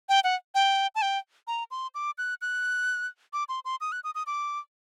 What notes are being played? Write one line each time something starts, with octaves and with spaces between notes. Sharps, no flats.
G5
F#5
G5
A5
G5
A#5
C6
D6
F#6
F#6
D6
C6
C6
D#6
F#6
D#6
D#6
D6